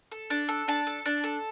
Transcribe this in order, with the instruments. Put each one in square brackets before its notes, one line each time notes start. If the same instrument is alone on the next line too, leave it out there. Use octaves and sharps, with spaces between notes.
[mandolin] A4
D4
A4
D4 A5
A4
D4
A4